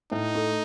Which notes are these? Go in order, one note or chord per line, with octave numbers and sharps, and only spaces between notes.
A2 D#4
A3